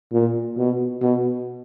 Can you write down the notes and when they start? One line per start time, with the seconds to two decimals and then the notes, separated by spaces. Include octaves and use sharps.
0.12 A#2
0.57 B2
1.02 B2